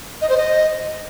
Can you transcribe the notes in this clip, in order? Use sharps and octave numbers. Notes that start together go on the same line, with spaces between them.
D#5
C5
D#5